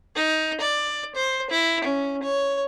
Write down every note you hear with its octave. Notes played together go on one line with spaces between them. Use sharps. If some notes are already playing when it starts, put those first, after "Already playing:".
D#4
D5
C5
E4
C#4
C#5